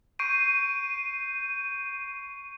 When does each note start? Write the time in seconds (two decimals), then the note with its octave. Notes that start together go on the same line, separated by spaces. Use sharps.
0.19 C#6 G6 C7 D7 D#7